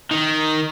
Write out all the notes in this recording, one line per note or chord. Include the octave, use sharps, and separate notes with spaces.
D#3